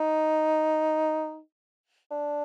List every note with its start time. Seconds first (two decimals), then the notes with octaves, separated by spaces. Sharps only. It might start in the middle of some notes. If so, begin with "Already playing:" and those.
Already playing: D#4
2.11 D4